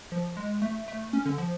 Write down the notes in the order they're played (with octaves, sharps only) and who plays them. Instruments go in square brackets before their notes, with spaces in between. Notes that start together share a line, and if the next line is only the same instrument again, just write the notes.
[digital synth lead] F3
G#3
A3
A3
C#4
D3
F3